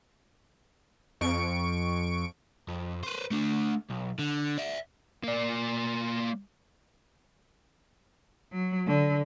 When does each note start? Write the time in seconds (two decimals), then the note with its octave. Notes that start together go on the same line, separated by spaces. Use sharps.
1.21 F2 C#6 D7
2.68 F2
3.03 B4 C5
3.31 A3 D4
3.90 B1
4.19 D3
4.58 D5 E5
5.24 A#3 D5
8.52 F#3
8.88 D3